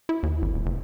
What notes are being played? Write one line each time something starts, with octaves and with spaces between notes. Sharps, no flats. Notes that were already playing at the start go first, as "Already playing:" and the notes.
E4
D#2
G#1
D#1
F1